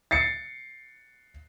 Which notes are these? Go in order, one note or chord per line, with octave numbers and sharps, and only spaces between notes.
A6 C7 C#7